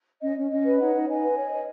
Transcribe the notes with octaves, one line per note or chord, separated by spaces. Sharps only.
C#4 D#5
C#4
C#4 D#5
B4
D#4 C#5 F#5
D#4
D#4 D#5 G#5
B4
C#5
C#5